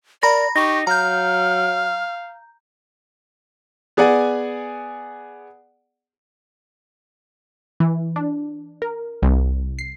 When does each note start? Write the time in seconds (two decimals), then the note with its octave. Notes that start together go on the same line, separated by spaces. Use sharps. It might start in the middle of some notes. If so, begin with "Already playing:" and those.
0.23 A#4 D5 A#5 B5 A#6
0.56 D#4 G4 C#6 A#6
0.87 F#3 F5 A#5 F6 G6
3.97 B3 G#4 D5 F#5 G#5
7.80 E3
8.16 D4
8.82 A#4
9.22 C2
9.79 C7